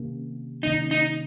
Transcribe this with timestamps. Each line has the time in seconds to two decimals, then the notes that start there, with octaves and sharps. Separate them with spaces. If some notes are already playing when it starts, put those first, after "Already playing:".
Already playing: C3 D#3 A#3 C#4
0.63 C3 D#3 A#3 C#4 D#4
0.91 D#4